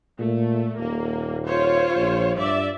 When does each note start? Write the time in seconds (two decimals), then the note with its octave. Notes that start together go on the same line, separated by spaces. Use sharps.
0.19 A#2 A3
0.79 D#1 A#3
1.47 F4 C5 C#5
1.95 A#1
2.38 G2 D5 E5